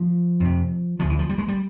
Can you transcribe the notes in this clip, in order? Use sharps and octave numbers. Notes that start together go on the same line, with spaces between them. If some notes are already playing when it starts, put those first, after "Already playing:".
Already playing: F3
F2 C3
D2 C#3 F3
E3
F3
G3
G#3
G3